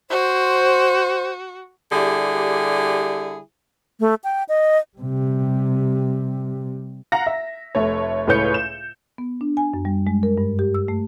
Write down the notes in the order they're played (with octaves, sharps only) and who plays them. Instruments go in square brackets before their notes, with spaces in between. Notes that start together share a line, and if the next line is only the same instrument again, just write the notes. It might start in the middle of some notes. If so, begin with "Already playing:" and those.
[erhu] F#4 [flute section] C5
[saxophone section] D3 G3 E4 G4 G#4
[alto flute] A3
G5
D#5
[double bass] C3 G3
[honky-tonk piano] F5 F#5 A#5 A#6
E5
F1 A3 C#5
C#2 A2 B4 C#5 G6 C#7
E7
[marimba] B3
D4
G#5
F#2
G3
G#3
A#4
G2
G4
E6
A3